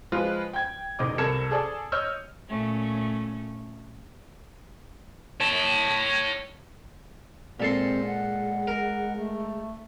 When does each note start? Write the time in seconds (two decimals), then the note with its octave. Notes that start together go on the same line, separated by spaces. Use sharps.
0.12 F3 G#3 F4 B4
0.53 G5 G#6
0.99 E1 D#3 D#5 D6
1.18 C2 A4 A#4 G#6 C#7 E7
1.51 G#4 A4 D5 A5
1.92 C#5 D#5 E6 F6 G6
2.48 A#2 A3 C#4
5.40 C#5 A5
7.60 A#2 G#3 C4 A4 C6
8.06 F#5
8.67 A#4
9.17 A3